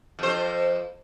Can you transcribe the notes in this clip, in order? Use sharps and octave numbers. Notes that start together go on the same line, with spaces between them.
F2 C5